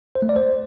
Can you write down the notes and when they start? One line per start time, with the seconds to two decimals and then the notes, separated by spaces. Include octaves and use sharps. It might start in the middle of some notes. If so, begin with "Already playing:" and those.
0.15 C5
0.22 A3
0.29 D5
0.36 C5